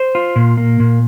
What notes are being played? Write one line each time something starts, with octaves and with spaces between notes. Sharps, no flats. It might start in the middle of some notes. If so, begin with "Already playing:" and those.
Already playing: C5
F4
A#2
A#3
A#2